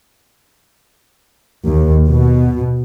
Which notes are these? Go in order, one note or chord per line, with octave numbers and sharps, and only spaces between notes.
D#2
B2